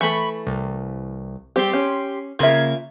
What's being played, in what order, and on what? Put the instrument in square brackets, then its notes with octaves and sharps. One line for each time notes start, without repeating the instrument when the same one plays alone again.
[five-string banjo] E3 A3 [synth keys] B5 C#6
[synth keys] C2
[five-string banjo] G3 C4 [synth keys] G4 C6
[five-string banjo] C#4
[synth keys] C#3 A#3 G#6 [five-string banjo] F4 E5